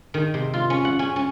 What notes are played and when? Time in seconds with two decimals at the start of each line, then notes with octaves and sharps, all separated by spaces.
0.14 D#3
0.34 C3
0.54 F4
0.70 C#4
0.85 F#5
0.99 C#4
1.16 C#4